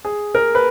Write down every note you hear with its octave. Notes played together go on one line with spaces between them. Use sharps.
G#4
A#4
B4